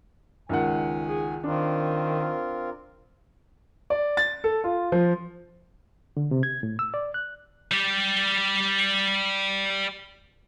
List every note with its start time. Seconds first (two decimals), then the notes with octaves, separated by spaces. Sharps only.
0.49 C#2 D#3 F#5 G#5
1.07 G#4
1.44 D#3 C4 D4 F4 A#4
3.90 D5
4.17 A6
4.44 A4
4.64 F4
4.92 F3
6.17 D3
6.31 C3
6.43 G#6
6.63 A2
6.79 E6
6.94 D5
7.14 F#6
7.71 G3 G4